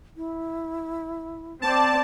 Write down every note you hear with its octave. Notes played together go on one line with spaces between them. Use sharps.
E4
C4 D5 A5